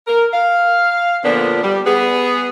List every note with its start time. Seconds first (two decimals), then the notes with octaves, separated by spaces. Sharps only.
0.07 A#4
0.32 F5
1.24 A#2 D3 F3 B3 D4
1.62 G3
1.85 B3 G#4